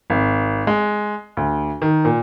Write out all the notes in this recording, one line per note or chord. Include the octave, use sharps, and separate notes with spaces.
G#1
G#3
D2
D#3
A#2